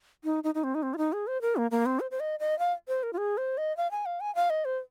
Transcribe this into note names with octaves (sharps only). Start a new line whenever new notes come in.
D#4
D#4
D#4
C4
D#4
C4
F4
D#4
G#4
C5
A#4
A#3
A#3
C4
C5
C5
D#5
D#5
F5
C5
A#4
F4
G#4
C5
D#5
F5
G#5
F5
G#5
F5
D#5
C5